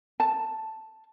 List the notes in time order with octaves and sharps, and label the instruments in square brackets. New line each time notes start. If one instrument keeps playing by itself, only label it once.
[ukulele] A5